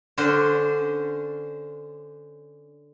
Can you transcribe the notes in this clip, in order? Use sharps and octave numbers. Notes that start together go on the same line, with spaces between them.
D3 C#4 D4 C5